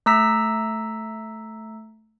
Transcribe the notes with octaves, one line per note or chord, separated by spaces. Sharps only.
A3 A#5 E6 B6